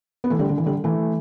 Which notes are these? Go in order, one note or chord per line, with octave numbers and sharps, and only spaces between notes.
B3
E3 A3
D3 G3
D3
E3
D3 G3
E3 A3